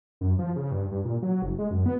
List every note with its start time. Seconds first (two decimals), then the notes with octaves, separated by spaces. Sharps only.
0.21 F#2
0.39 F3
0.56 C#3
0.71 G2
0.91 G2
1.05 A#2
1.23 F#3
1.42 F#1
1.58 G#3
1.71 F#2
1.86 B3